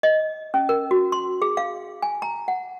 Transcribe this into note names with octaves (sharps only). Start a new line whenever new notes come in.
D#5
C#4
A#4
F#4
C6
G#4
F5
G#5
A#5
F#5